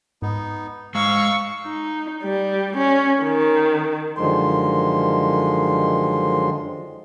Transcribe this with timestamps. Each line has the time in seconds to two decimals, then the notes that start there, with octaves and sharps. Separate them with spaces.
0.22 G#2 B3 D#4
0.95 G#3 C5 F5 C#6 E6
1.65 D#4
2.23 G3
2.78 C#4
3.23 D#3
4.16 F#2 D3 D#3 F3 G#3 C6